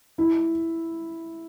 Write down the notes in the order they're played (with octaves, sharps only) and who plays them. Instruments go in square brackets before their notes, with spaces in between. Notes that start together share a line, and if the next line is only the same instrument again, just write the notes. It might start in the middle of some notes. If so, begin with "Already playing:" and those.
[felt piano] E4